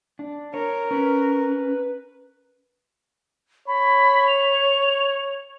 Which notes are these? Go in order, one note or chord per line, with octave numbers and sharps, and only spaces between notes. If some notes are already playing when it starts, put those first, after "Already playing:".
D4
A#4 C#5
C#4 B4
C#5 B5
F7